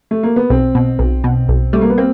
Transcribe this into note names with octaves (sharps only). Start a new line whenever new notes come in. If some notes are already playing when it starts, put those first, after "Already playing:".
A3
A#3
B3
B1 C4
B2
B1
B2
B1
G3 A3
A#3
B3
A#3 C4